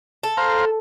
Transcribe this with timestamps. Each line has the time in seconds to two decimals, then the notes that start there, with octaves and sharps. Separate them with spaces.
0.23 A4
0.37 C5 F5 A#5